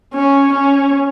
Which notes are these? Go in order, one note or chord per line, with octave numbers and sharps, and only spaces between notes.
C#4
C#4